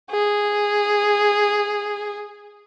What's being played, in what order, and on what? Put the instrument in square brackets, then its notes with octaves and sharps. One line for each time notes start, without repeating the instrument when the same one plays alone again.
[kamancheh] G#4